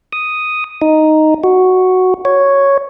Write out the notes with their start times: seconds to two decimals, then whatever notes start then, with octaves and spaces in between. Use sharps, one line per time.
0.13 D#6
0.82 D#4
1.44 F#4
2.25 C#5